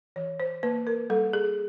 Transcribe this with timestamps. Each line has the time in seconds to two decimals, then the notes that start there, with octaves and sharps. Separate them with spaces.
0.16 E3 C#5
0.40 C5
0.63 A#3 B4
0.87 A#4
1.10 G3 A4
1.33 G#4